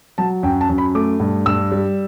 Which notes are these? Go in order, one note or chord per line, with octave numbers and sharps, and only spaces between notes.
F#3 A5
F#2 G5
A5
F#2
B5
A3 D6
G2
G2 E6
G3